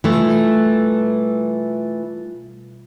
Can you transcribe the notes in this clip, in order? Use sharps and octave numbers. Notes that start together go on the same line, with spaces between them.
B2 E3 G3 A3 F4